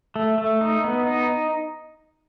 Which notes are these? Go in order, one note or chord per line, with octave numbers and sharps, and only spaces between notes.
A3
A3
D#4
B3
D#4